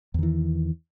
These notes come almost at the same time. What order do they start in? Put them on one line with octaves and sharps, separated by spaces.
E2 D#3 E3